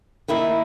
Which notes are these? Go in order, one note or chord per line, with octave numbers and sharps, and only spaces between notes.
D#3 A#3 E4